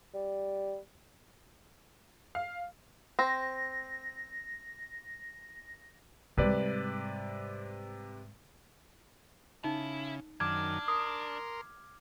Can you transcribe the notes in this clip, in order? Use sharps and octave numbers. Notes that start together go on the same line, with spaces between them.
G3
F5
C4 A#6
G#2 C3 G3 B4 D5
C#3 D#4 E4
F#2 D#3 D4 D6 F6 G#6
A#4 C6 D#6